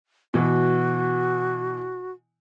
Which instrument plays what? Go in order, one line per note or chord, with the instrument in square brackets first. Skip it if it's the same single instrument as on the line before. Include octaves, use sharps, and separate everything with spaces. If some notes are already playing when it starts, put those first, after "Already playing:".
[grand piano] B2 E3 [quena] F#4